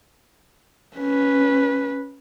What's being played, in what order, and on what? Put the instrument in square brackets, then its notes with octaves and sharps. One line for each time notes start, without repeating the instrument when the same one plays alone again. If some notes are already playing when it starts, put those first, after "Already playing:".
[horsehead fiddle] C#4 B4